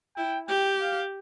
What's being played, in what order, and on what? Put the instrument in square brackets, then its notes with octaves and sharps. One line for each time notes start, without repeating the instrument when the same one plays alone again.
[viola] E4 [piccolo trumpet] G5
[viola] G4 [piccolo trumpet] G5
[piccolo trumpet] F5